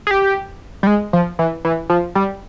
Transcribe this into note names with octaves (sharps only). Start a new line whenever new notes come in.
G#4
G4
G3
G#3
F3
E3
E3
F3
G3